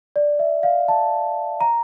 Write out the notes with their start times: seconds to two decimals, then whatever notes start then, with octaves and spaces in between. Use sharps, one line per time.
0.16 D5
0.39 E5
0.63 F5
0.88 A5
1.61 A#5